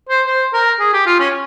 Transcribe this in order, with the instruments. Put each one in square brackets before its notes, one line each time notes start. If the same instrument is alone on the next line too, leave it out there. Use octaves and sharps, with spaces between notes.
[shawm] C5
C5
A#4
G#4
G4
F4
C#4